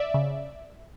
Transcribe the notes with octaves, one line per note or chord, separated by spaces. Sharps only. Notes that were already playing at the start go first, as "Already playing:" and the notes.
Already playing: D5 E5
C#3